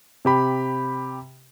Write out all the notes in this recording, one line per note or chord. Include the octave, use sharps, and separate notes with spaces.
C3 G4 B5